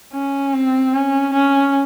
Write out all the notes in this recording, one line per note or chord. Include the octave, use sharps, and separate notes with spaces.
C#4
C4
C#4
C#4